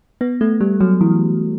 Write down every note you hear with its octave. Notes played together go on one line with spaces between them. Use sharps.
B3
A3
G3
F#3
E3